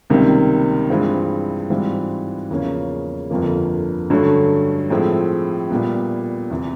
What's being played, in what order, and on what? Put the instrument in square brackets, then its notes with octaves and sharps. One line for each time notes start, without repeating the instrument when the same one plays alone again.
[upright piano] C#2 C3 D#3 G3 A#3
G2 E3 G#3 C4 F4
G#2 E3 G3 C4 F4
E2 C#3 F3 A#3 C#4
G1 F2 D3 F3 A#3
G2 D3 F#3 A3 C#4
A2 F3 G#3 C4 E4
A#2 G3 B3
E2 C3 E3